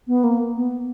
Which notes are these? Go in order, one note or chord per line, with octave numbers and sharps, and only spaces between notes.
B3
A#3
B3